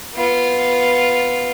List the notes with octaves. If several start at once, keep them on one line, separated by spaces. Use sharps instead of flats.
B3 F4